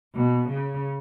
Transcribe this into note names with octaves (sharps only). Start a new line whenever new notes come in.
B2
C#3